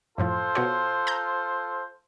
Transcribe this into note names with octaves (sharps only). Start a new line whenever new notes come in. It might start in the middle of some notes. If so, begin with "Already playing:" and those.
F#2 A2 F3 F4 A4 C5
B2 F#4 C#5
A#5 G6